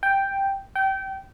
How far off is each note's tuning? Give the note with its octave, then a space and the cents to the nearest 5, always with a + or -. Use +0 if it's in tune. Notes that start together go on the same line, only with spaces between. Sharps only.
G5 +0
G5 -25